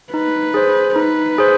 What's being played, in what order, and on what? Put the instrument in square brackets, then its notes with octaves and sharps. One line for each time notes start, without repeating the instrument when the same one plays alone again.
[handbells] D#4 [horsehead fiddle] B4
[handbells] G#4 C5
[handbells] D#4 [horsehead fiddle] B4
[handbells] G#4 C5